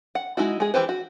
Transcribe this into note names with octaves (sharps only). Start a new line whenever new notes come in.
F#5
G#3 D#4 E4 F#4
G#3 G#4
E3 E4 G4 B4 C5
F#4